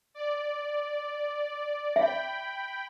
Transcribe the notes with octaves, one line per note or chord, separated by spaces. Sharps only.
D5
E5 G5 B5